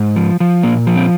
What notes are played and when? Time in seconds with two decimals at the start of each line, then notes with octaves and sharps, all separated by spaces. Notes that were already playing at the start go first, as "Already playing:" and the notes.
Already playing: G#2
0.16 F3
0.40 F3
0.63 A#2 A#3
0.87 F3
0.96 C4